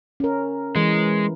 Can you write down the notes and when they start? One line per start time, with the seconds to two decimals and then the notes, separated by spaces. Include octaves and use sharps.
0.20 C#4 A#4
0.76 E3 G#3